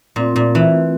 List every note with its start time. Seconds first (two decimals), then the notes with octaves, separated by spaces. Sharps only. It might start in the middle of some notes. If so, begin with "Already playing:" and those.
0.16 A#2 A3 C4 F4
0.36 A#2
0.55 E3